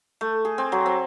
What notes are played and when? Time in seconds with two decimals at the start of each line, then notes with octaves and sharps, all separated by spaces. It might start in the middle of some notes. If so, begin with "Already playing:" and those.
0.21 A3
0.45 G#4
0.58 C4
0.72 F#3
0.86 C4